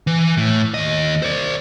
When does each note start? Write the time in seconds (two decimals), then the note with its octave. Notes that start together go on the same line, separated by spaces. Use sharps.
0.07 E3
0.37 A2
0.74 D#2 D#5
1.23 C5 D5